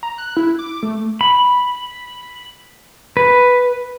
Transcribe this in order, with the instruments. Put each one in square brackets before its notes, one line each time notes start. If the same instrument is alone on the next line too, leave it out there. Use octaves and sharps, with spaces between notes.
[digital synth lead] A#5
F#6
E4
D6
A3
[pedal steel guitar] B5
B4